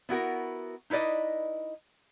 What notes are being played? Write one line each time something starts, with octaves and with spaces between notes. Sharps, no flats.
B3 E4 F#4 A#4
D#4 E4 B4 D5 D#5